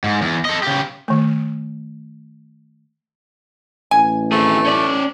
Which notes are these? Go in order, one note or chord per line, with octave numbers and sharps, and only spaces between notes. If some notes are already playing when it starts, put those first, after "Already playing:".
G#2
E2
A4 D#5
C#3 G4
D#3 A3
A1 G#5
A3 C4 G#4
C#4 D5